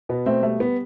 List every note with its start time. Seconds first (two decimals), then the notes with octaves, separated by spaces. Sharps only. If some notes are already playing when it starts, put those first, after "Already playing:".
0.09 B2 B3
0.26 A3 C4
0.43 G3 A3
0.60 B3